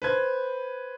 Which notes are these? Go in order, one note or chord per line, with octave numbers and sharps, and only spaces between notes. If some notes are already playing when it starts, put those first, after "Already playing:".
B4 C5 G#6